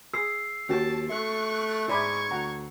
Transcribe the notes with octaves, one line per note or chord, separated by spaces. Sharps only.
G#4 E6 C7
D#2 C#4 F#4 G5 A5
A3 E5 C#6 F#6
G#2 E4 D5 B5 C#6 G#6
D2 F#5 G5 A#5